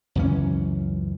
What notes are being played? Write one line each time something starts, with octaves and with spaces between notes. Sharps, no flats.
C#2 F#2 E3 C#4